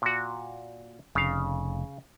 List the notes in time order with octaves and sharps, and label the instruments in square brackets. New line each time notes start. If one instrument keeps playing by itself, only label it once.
[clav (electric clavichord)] A#2 F#4
[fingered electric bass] F1 [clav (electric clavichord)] C#3 F5